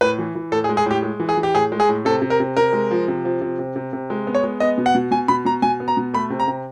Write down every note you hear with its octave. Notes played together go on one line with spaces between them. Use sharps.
A2 B4
E3
E3
A2 A4
G#4
G#3
G#4
A2 G4
G#3
E3
G#4
E3
G4
A2 G#4
G#3
G#4
A2
C3 A4
C3
A#4
C3
C3 A#4
G#3
F3
C3
F3
C3
C3
C3
C3
G#3
B3
C#5
G#3
B3 D#5
B2
F#5
B2
B2 G#5
B2 B5
B2 A#5
B2 G#5
B3
A#5
B2
A3 B5
C3
A#5
C3